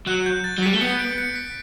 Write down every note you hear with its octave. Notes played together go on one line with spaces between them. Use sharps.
F#3 F#6
G6
A6
F#3
B6
G3
A3
B3 C#7
D7
C#7
B6